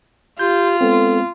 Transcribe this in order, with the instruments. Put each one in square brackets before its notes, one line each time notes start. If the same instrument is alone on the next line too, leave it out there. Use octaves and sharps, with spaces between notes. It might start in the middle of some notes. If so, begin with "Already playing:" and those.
[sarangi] F4 [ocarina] G4 [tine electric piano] G6
[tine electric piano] G#3 B3 C4 [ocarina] A4